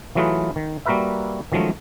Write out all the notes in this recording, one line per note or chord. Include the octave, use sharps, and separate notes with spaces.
E3 F#3 A3 F4 G#4 B4
D#3
G3 A#3 F#4 A#4 B4 E5
D#3 F3 F#3 G#3 A3 C#4